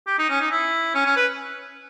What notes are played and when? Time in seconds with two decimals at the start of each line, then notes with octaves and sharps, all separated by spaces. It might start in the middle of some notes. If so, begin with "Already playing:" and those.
0.07 G4
0.19 D#4
0.30 C#4
0.41 D#4
0.51 E4
0.95 C#4
1.06 C#4
1.16 B4